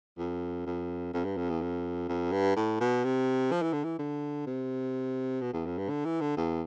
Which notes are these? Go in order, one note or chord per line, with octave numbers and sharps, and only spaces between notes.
F2
F2
F2
G2
F2
E2
F2
F2
G2
A2
B2
C3
F3
E3
D3
E3
D3
C3
B2
E2
F2
G2
D3
E3
D3
E2